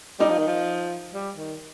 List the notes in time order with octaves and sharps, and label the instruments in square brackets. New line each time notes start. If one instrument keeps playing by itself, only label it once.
[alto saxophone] G3 [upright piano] D#4
[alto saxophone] F3
D#3
F3
G3
D#3